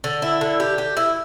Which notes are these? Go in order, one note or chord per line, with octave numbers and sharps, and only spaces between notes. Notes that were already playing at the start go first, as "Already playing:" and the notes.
D3
E4
D3
G4
G4
E4